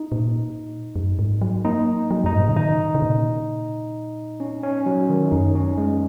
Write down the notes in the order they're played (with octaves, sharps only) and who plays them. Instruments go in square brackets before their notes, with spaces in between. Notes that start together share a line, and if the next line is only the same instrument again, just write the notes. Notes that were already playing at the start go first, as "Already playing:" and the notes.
Already playing: [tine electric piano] D#4
[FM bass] A#2
F#2
G#2
F#3
[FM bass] A#3 [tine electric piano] D#4
[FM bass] F#3
[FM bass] F#2 [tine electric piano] D#4
[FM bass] G#2
A#2
C#3
[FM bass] D#3 [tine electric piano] D#4
[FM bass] C#3
A#2
[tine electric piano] C#4
C#4
F#3
D#3
[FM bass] F#2 [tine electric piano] D#4
[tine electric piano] C#4
G#3